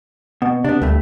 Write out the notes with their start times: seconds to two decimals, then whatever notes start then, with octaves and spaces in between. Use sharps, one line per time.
0.42 B2 B3
0.64 C3 B3 D4
0.82 D2 G2 A3